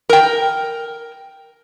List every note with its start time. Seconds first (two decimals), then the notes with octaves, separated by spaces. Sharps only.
0.09 A#4 G5